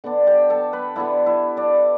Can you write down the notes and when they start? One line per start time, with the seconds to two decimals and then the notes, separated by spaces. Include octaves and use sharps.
0.04 D3 B3 D4
0.27 G4 G5
0.50 A4 A5
0.73 B4 B5
0.96 D3 B3 D4 E4 E5
1.26 E4 E5
1.57 D4 D5